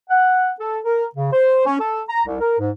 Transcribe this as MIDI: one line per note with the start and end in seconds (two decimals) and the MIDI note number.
0.10 0.51 78
0.60 0.78 69
0.85 1.05 70
1.16 1.32 49
1.33 1.63 72
1.66 1.79 61
1.79 2.01 69
2.09 2.22 82
2.26 2.37 36
2.39 2.57 70
2.59 2.70 44